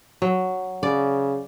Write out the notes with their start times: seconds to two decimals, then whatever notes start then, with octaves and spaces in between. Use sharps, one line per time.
0.22 F#3
0.83 C#3 D5